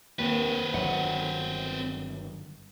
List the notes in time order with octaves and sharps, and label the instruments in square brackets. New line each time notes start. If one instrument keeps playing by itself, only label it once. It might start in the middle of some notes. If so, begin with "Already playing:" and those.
[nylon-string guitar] D#2 [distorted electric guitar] C4 B4
[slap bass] G1 D#3 F#3 [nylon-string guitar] F#5